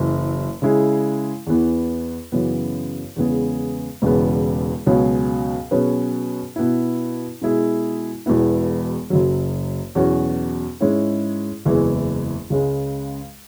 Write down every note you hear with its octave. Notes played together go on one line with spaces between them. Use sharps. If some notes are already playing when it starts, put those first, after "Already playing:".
Already playing: F#1 F#2 E3
C#3 G#3 E4 G#4
E2 E3 B3
F#2 C#3 E3 B3
E2 C#3 G#3 B3 G#4
E1 E2 C#3 E3 B3
C#2 B2 F#3 C#4 G#4
B2 F#3 C#4 G#4 B4
B2 B3 E4
B2 G#3 E4 G#4
E1 E2 B2 B3 E4
F#1 F#2 F#3
E2 B2 F#3 C#4 F#4
G#2 G#3 C#4 E4 C#5
F#1 E2 E3 G#3 E4
C#2 C#3 G#3